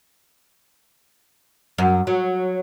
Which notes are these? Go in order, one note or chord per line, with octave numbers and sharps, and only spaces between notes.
F#2
F#3